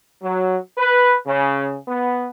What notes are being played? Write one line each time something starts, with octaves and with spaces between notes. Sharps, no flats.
F#3
B4
C#3
B3